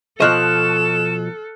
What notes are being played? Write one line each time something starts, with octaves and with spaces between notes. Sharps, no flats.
B2 F3 A4 D#5 C#6 F6 F#6 E7